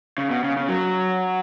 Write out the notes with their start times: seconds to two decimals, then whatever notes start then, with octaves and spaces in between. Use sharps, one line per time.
0.18 C#3
0.30 B2
0.43 C#3
0.57 C#3
0.69 F#3